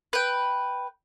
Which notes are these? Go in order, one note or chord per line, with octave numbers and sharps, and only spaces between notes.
B4 G5